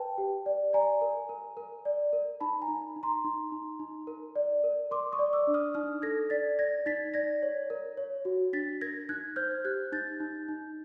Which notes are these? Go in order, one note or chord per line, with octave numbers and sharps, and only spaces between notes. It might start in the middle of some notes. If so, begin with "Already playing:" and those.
Already playing: B4 G5 A5
G4
D5
D5 G#5 A#5
A#4
A#4
A#4
D5
A#4
D#4 A5 B5
G#5 A#5
D#4
D#4
A#5 C6
D#4
D#4
D#4
A#4
D5
A#4
A#4 C6 D6
C#6 D#6
D5
D6 E6
D4
D#6 F6
D#4 D#6 F6
A4 G#6 A#6
D5 A6 B6
D5 G#6 A#6
D#4 A6 B6
D5 G#6 A#6
C#5
A#4
C#5
F#4
D4 A6 B6
A#4 G#6 A#6
D#4 F#6 G#6
C5 F6 G6
G4 F#6 G#6
D#4 G6 A6
D#4
D#4